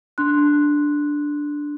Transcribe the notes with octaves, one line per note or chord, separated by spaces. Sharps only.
D4 C6 F#6